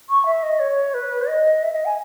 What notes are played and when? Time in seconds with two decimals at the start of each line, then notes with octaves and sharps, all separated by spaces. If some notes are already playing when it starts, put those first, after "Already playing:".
0.09 C#6
0.25 E5
0.42 D#5
0.59 C#5
0.94 B4
1.28 D#5
1.62 E5
1.73 D#5
1.85 G#5